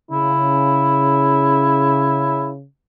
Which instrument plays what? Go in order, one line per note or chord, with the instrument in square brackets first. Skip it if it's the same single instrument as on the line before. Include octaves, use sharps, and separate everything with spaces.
[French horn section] C#3 [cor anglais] E4